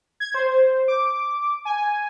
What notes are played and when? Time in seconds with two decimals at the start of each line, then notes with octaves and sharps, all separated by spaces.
0.20 G#6
0.34 C5
0.88 D6
1.65 G#5